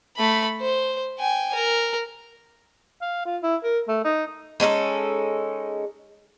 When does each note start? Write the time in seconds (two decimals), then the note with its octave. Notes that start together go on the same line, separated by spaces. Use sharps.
0.16 A3 B5
0.61 C5
1.19 G5 G#5
1.54 A#4
3.02 F5
3.25 F4
3.43 E4
3.64 A#4
3.88 A3
4.04 D#4
4.60 G#3 C#4 D#4 A4